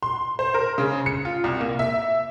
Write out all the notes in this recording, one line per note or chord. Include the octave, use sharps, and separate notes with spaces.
C6
C5
A#4
C#3
C#7
F4
C2
A#3
E5